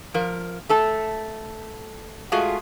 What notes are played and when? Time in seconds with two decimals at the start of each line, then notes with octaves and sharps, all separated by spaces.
0.14 F3 A#4
0.69 A3 A4 A5
2.32 G#3 A3 F4 F#4 G#4